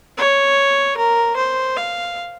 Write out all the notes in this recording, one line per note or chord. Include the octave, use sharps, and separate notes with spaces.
C#5
A#4
C5
F5